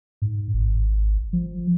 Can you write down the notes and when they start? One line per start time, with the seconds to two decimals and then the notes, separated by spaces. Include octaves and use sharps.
0.22 G#2
0.54 G#1
1.33 F3